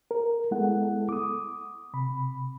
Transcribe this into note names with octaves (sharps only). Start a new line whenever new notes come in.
A#4
G#3 B3 E4 A4 F#5
D6 D#6
C3 B5